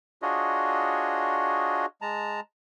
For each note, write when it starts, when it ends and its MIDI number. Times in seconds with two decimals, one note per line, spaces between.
0.22 1.86 62
0.22 1.86 65
0.22 1.86 66
0.22 1.86 68
0.22 1.86 73
0.22 1.86 75
2.02 2.40 56
2.02 2.40 81
2.02 2.40 82